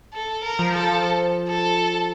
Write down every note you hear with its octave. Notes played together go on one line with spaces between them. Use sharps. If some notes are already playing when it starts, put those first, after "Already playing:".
A4
A#4
F3
A4
A4